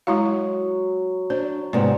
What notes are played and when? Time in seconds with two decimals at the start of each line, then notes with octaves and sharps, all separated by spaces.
0.07 F#3 G#3 E4 F5
1.30 D4 C5
1.73 G#2 C3 B3 D5